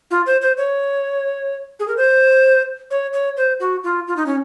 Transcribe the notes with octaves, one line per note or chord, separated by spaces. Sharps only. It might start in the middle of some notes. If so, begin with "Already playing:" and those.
F4
C5
C5
C#5
G#4
A#4
C5
C#5
C#5
C5
F#4
F4
F4
D#4
C#4